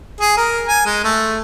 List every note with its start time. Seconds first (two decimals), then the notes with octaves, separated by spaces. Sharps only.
0.21 G#4
0.37 A#4
0.68 G#5
0.86 G#3
1.04 A3